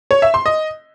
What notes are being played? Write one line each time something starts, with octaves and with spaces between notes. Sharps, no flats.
C#5
E5
C6
D#5